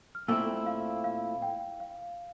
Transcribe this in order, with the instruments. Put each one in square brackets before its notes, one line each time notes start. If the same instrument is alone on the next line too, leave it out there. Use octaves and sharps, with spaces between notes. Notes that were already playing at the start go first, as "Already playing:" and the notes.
[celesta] F6
[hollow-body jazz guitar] A#2 A3 C4 E4 [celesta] E6
[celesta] F5
F5
G5
F5